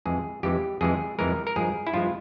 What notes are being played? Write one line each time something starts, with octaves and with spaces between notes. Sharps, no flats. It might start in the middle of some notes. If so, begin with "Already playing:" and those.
F2 E3 G#3 G#4
F2 E3 G#3 G4
F2 E3 G#3 G#4
F2 E3 G#3 A#4
A#4
G2 F3 G#3 G#4
E4
G2 F3 G#3 F4